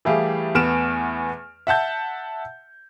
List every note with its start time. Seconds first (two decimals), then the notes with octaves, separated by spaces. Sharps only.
0.05 E3 G3 A3 G4 G#4 F5
0.55 E2 A3 B3 F6 D7 E7
1.67 E5 F#5 A5 G6